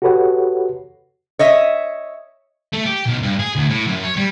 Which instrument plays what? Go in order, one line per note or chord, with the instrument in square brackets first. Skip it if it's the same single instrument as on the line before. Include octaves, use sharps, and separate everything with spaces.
[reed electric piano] F#4 G4 A4 B4 C#5 F#5
[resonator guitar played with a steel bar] C#5 D#5 E5
[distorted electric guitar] A3
G4
B1
G2
G#4
D2
A2
F#2
C#5
G3